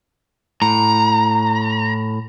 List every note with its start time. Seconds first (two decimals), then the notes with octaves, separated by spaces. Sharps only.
0.62 A2 A#5